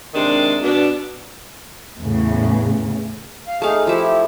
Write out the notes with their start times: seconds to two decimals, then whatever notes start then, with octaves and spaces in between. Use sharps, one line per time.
0.14 C3 D#3 G#3 D4
0.62 B2 D4
2.01 E2 A2 C#3
3.47 F5
3.62 A3 D#4 G#4 F5
3.87 F3 E4 G4 E5